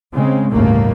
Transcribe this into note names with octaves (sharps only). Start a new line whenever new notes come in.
C#3 G#3 C4
G1 D#2 A2 C#3 A3 A#3